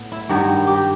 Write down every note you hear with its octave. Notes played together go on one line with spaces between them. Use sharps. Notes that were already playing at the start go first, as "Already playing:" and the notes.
Already playing: A2 B3
E4
G2 D#3 F#3 F#4
G4